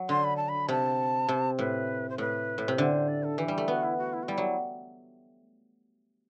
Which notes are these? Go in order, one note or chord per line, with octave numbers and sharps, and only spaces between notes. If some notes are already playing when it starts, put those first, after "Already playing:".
Already playing: F#3
D3 C6
B5
A5
B5
C3 A5
C3
A2 B4
C5
A2 B4
A2
C3
D3 C5
D5
A4
E3 G4
G3
A3
B3 F#4
E4
F#4
E4
F#4
G3 E4
F#3